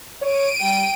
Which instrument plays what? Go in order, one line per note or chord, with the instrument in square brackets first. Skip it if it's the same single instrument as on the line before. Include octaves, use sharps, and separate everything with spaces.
[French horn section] C#5 [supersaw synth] D7 D#7
[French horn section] G3 [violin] G5